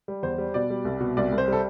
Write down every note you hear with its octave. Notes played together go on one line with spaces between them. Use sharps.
G3
E2 C5
G3
B2 D5
G3
C2
B2
C2 D5
C2
C5
G3 A4